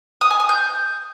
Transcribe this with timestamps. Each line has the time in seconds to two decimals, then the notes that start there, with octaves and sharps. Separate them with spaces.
0.21 D#6
0.30 G#5
0.40 D#6
0.49 G6